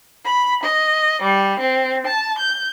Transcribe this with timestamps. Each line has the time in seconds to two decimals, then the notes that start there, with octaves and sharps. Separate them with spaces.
0.25 B5
0.62 D#5
1.22 G3
1.59 C4
2.06 A5
2.38 G6